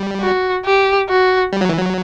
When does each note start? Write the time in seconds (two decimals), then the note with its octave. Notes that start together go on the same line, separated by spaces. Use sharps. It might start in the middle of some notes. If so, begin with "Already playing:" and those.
Already playing: G3
0.22 F#4
0.65 G4
1.09 F#4
1.53 G3
1.61 F#3
1.69 E3
1.78 F#3